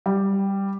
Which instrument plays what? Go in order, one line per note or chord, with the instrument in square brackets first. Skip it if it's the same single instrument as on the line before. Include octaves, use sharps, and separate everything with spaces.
[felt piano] G3